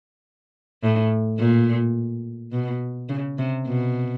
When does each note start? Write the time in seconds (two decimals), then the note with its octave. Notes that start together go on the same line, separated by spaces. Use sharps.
0.83 A2
1.39 A#2
2.52 B2
3.09 C#3
3.38 C3
3.67 B2